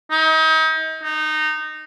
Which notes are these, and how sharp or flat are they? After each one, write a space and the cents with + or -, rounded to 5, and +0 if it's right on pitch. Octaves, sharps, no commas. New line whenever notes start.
D#4 +35
D#4 -15